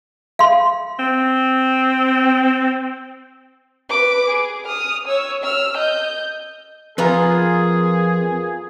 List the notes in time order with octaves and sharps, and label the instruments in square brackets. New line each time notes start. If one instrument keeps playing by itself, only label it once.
[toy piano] F5 C6
[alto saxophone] C4
[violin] B4 D6
G#4
D#6 F6
C#5 E6
E6 F6
D#5 G6
[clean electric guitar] F2 [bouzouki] B3 F4 A#4 [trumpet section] G#4